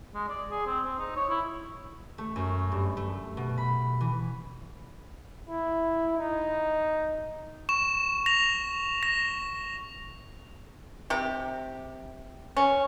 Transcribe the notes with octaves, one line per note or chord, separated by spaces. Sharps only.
G#3
D5
G#4
C4
C4
D#4
C#5
E4
A3
F#2
G2
A3
B2
B5
E3
E4
D#4
C#6 E7
A#6 F7
A#6
C3 G4
C#4